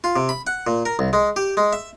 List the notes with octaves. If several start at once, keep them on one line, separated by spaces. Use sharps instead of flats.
F4
C3
B5
F#5
A#2
A#4
C2
G#3
G4
G#3
E5